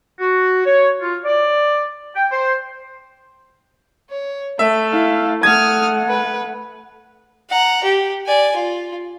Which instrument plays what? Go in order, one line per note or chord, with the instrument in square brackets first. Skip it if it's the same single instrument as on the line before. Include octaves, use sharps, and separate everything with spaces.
[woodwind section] F#4
C#5
F4
D5
G5
C5
[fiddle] C#5
[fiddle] A3 [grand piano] E5
[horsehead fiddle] E4 F5
[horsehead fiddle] A3 F#5 [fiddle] D#6 F6 [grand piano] G#6
[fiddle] B4
F#5 A#5
G4
D5 G#5
F4